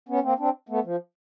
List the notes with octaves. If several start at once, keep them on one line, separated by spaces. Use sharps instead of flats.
B3 C#4
A#3 C4
C4 D4
A3 B3
F3